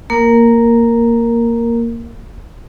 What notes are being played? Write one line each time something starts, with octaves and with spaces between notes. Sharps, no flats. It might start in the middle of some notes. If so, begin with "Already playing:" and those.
A#3 A#4